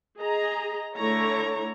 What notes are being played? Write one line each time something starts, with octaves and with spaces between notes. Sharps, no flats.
G#4 D#5 A#5
D3 A3 E4 C#5 A#5